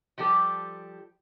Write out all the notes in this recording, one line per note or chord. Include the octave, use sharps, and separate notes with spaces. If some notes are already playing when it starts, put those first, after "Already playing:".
F3 G3 G4 A4